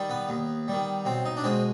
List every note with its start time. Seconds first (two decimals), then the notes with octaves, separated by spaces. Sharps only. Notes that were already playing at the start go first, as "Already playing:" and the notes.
Already playing: D#3 G3
0.10 B3
0.29 D#2
0.68 D#3 G3
1.05 B1 C4
1.25 D#4
1.37 D4
1.44 B2 G#3 C4